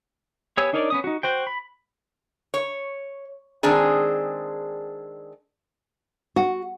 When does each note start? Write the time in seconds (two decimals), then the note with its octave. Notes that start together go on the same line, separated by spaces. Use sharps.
0.57 B3 G4 C#5 G#5 E6
0.73 D4 D#4 A#4 C#5 D5
0.90 B3 C#4 D#6
1.04 D#4 F#4
1.23 F#4 C5 G5
1.47 B5
2.54 C#5
3.63 D#3 G#3 C4 D4 G#4
6.36 F#4